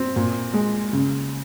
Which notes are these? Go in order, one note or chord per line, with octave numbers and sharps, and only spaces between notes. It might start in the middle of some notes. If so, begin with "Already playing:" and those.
Already playing: C4
A#2
G#3
C#3